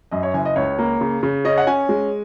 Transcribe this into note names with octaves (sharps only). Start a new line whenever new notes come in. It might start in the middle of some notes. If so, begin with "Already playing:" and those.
F#2 D#5
C#5
F#1 G#5
D#5
C#2 C#5
A#3
C#3
C#3
C#4 D#5
F#5
C#4 G#5
G#3